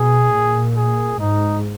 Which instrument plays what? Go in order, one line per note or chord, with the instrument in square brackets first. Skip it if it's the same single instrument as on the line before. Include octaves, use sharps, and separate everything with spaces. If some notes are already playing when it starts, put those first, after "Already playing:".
Already playing: [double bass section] B2 [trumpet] G#4
[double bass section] A#2
[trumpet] G#4
[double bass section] G#2 [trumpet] D#4